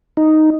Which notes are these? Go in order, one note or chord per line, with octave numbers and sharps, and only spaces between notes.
D#4